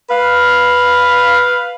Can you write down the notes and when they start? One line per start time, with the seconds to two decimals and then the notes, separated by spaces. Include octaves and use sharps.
0.10 B4 F5